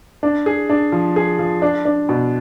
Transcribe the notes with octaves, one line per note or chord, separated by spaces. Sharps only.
D4
G#4
D4
F3
G#4
F3
D4
D4
B2